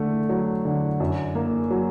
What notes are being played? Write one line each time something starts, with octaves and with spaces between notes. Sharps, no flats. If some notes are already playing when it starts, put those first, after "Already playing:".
Already playing: D3 A3
F#3
D3
F#2
A#3
F#3